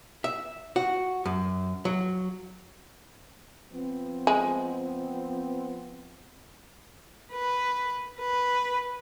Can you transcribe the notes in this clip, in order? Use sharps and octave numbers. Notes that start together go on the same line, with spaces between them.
E5
F#4
F#2
F#3
F3 B3 C4
G#3
B4
B4